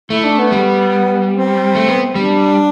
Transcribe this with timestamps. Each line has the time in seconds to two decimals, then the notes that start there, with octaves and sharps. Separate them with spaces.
0.10 A3 E4
0.24 D4
0.38 B3
0.51 G3
1.34 C4
1.75 A3
1.88 B3
2.15 G3 D4